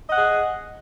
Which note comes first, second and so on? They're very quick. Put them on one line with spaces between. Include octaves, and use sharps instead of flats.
D#5 F#5 G#4